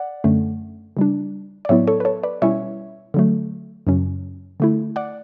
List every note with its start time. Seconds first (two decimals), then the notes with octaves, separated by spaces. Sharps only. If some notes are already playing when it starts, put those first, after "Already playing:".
Already playing: D5 F#5
0.24 F#2 D3 A3 C#4
0.97 C#3 G3 D4
1.65 D5
1.69 A2 F#3 B3 E4 C#5 E5
1.87 A4 C#5
2.00 B4
2.05 A4 C#5
2.23 B4 D5
2.42 B2 G3 C#4 E4 C#5 E5
3.14 D3 F#3 A3
3.87 F#2 C#3 F#3 C#4
4.60 D3 A3 E4
4.96 D5 F#5